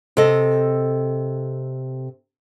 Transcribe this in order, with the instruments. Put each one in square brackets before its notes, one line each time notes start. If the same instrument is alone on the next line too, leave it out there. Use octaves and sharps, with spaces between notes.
[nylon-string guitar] C3 A4 D#5